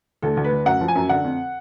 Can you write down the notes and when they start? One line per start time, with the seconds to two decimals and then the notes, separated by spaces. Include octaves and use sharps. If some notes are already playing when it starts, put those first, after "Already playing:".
0.22 D2 A4
0.37 D2
0.44 B4
0.52 D2
0.65 F#2 F#5
0.81 F3
0.88 G#5
0.95 F#2
1.09 D3 F#5
1.24 F2